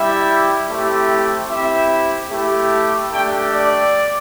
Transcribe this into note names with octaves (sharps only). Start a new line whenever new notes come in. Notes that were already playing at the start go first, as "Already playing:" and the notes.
Already playing: G3 E4 G4 E5
A3 C4 E4 G4
C4 E4 G4 E5
A3 E4 G4
A3 D4 G4 G5
D5